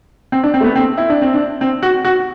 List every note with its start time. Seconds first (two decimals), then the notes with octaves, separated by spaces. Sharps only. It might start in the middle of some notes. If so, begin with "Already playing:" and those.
0.32 C4
0.43 D4
0.54 C4
0.61 A3
0.65 B3
0.76 C4
0.98 E4
1.10 D4
1.22 C4
1.34 D4
1.61 C4
1.83 F#4
2.05 F#4